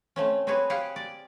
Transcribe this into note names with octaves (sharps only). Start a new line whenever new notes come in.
A3 C4 C#4
C4 F#4 G#4 B4 C#5
G4 G#4 F5 F#5
D5